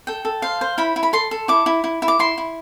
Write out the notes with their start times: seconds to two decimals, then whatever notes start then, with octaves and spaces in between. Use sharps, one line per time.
0.07 A4 G5
0.25 A4
0.42 C5 F5
0.61 C5
0.78 E4 B5
0.96 E4
1.03 B5
1.13 A4 C6
1.31 A4
1.48 E4 D6
1.66 E4
1.84 E4
2.02 E4
2.08 D6
2.19 E4 C6
2.38 E4